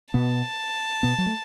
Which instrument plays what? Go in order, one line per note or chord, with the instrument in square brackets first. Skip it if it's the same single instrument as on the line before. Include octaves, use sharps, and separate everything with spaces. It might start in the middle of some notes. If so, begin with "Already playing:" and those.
[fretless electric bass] B2 B3 [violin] A5
[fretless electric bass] B2 B3
F#3
A3